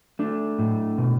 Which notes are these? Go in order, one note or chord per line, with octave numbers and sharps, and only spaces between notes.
A3 D4
A2
B2